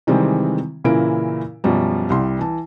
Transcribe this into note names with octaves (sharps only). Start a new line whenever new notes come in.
C3 D#3 E3 G3 G#3 C4
A#2 C#3 E3 E4 A#4 D7
F#2 B2 F3 G3
C2 G3 C6
E3 A5